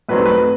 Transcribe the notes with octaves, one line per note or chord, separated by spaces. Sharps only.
G2 D#3 F#3 A3 C4 B4
B4